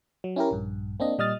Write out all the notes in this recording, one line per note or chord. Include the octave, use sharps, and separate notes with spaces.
F#3
C#4 E4 G4 A#4
A#1 G2
A#3 C4 D4 D#5
A#2 G3 D#5 D#6 F6 A6